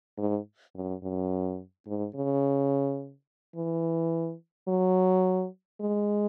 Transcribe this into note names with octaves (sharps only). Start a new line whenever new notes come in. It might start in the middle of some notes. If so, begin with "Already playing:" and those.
G#2
F#2
F#2
G#2
C#3
E3
F#3
G#3